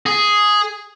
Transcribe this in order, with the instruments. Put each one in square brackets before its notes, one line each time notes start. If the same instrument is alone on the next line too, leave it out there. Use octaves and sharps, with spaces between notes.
[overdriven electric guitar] G#4